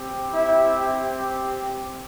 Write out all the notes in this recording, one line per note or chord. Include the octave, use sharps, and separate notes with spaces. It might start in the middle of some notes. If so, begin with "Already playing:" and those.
Already playing: C4 G4
E4 E5